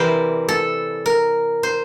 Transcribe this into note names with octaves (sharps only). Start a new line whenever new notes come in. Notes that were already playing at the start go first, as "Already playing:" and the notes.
Already playing: C3 E3 G3 A#4 C5
A4
A#4
C5